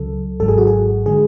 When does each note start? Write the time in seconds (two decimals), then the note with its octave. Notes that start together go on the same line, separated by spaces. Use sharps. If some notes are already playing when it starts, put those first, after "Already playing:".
Already playing: C#2 C#3 F#3 A4
0.40 G#1 G#2 F#3 A4
0.48 G#4
0.58 F#4
0.67 G#4
1.06 D3 G#3 G#4